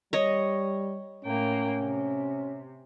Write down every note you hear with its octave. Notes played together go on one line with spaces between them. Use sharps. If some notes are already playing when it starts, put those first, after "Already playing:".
G3 C#5 D#5
A2 A#3 C#4 G5
C3